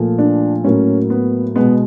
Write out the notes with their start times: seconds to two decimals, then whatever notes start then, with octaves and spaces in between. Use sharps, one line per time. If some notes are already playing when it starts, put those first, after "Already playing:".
Already playing: A#2 F3 A3
0.18 D4
0.64 A2 F#3 A#3 C#4
1.10 B3
1.56 B2 G#3 B3